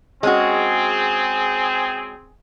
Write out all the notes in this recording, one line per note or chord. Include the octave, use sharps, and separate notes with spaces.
G#3 C4 C#4 F#4 G#4